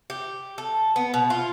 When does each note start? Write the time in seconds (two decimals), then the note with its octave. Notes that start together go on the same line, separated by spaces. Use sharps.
0.10 G4
0.58 A4
0.96 B3
1.14 B2
1.30 F4